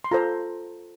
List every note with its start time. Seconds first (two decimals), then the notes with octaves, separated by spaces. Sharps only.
0.04 C6
0.11 F4 A4 C5 A#5